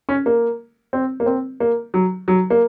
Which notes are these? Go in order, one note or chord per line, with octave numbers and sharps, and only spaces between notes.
C#4
A#3
C4
A#3
C4
A#3
F#3
F#3
A#3